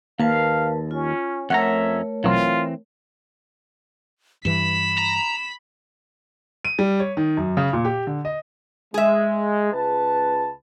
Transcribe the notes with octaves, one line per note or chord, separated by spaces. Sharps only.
D#2 A#3 A#4 B4 F5 A5
C#4 F4
F2 A3 C#4 A#4 C#5 E5 F#5 A#5
A#1 B2 E3 F#3 C4 F4
G2 E3 B5 B6 E7
A#5
D#7
G3
C#5
D#3
F#2
C#3
A#2
G4
D3
D#5
G#3 G#4 E5
C#2 B4 A5